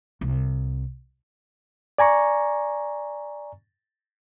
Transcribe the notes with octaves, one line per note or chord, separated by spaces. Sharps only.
C2
D5 G#5 A#5 C#6